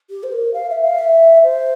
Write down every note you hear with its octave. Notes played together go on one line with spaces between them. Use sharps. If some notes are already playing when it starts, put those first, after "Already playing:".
G4
C5
A#4
F5
E5
F5
E5
C5